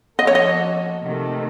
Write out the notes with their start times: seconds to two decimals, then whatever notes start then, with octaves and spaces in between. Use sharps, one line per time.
0.19 F3 A#3 C#4 F#4 A4 D#5
0.27 C#5
0.35 D#5
1.02 C3 D#3 A3